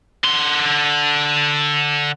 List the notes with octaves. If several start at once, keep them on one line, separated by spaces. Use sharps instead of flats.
D3 C6